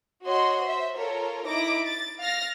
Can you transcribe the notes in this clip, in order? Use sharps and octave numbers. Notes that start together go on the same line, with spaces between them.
F#4 C#5 D#5 C6
C5 E5
F4 A4 A#4 C#5
D#4 E4 D6 A#6
A6
F5 F6 A6 A#6